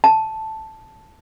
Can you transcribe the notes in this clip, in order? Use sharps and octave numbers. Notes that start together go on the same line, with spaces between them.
A5